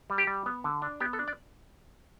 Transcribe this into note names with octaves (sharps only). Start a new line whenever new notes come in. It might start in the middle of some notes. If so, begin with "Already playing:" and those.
G3
G4
G3
B3
D3
D4
B3 G4
A4
D4
D5